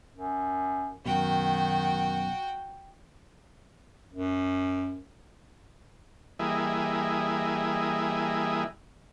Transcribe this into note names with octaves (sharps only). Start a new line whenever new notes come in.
F#2
F#2 B2 D#3 F#4 G5
F#2
E3 G3 A#3 E4 G#4 D#5